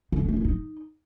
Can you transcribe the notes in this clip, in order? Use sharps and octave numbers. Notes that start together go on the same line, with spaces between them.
D3
D4
A3
E4
D#4